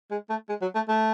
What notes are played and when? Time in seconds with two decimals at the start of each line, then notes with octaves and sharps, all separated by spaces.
0.11 G#3
0.30 A3
0.49 G#3
0.62 F#3
0.75 A3
0.89 A3